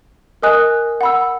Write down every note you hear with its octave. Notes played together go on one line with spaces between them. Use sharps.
A#4 D#5 G#5 D#6 F#6
F#5 B5 E6